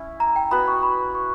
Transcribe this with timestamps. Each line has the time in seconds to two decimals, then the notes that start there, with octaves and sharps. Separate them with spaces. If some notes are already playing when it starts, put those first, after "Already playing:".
Already playing: C#4 E4
0.20 A#5
0.36 G5
0.51 B3 F#4 B4 B5
0.68 C#6
0.83 B5
1.15 C#6